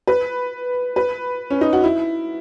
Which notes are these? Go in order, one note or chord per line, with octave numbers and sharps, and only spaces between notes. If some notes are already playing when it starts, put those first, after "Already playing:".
B4
B4
C#4
D#4
F#4
E4